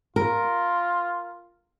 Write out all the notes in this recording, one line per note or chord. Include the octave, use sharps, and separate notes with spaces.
F4 A#4